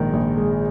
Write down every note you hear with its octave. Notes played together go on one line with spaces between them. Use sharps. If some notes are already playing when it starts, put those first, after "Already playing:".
Already playing: A#1 G#2 D#3
A#1
G#3